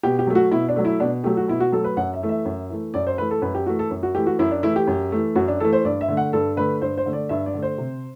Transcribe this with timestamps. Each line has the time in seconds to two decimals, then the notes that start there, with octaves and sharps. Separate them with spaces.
0.03 B2 G4
0.19 G4
0.27 F#3 A3
0.35 F#4
0.51 B2 E4
0.68 D4
0.76 F#3 A3
0.85 E4
1.00 B2 D4
1.24 F#3 A3 G4
1.37 F#4
1.48 B2 E4
1.60 F#4
1.72 F#3 A3 A4
1.84 B4
1.97 F#2 F#5
2.14 E5
2.22 E3 A3
2.29 E5
2.45 F#2
2.70 E3 A3
2.94 F#2 D5
3.07 C5
3.18 E3 A3 B4
3.31 A4
3.42 F#2 B4
3.55 G4
3.66 E3 A3 F#4
3.79 A4
3.91 F#2
4.03 F#4
4.15 E3 A3 G4
4.27 F#4
4.39 F#2 E4
4.51 D4
4.63 E3 A3 E4
4.76 G4
4.87 F#2
5.12 E3 A3
5.35 F#2 F#4
5.48 D4
5.60 E3 A3 A4
5.73 C5
5.85 G2 D5
6.01 E5
6.08 D3 A3
6.17 F#5
6.33 G2 A4
6.57 D3 A3 B4
6.82 G2 C5
6.97 C5
7.06 D3 A3
7.13 D5
7.29 G2 E5
7.46 D5
7.54 D3 A3
7.62 C5
7.78 C3